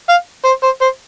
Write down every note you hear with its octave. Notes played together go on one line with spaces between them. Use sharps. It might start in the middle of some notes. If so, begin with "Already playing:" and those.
F5
C5
C5
C5